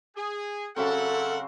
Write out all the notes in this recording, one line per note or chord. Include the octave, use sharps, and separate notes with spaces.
G#4
C#3 F#3 C4 A4 A#4 E5 F#5